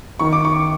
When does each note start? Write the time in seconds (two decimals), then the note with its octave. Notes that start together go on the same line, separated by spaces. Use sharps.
0.19 D#3 C#6
0.33 D6
0.45 C#6